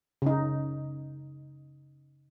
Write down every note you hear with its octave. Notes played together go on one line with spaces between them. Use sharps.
C#3 D#4